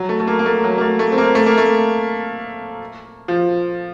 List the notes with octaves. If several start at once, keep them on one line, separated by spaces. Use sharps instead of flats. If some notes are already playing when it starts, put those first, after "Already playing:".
Already playing: F#3
A3
A3
A#3
A#3
A3
F#3
A#3
A3
A3
C4
A#3
A3
A#3
A3
F3